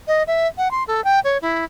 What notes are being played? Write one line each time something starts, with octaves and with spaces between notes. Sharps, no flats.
D#5
E5
F#5
C6
A4
G5
C#5
E4